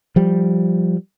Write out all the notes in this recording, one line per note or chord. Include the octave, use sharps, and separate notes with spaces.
F3 G3